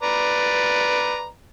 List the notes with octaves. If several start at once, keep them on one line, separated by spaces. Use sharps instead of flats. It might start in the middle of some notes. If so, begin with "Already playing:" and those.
B4 D5 A#5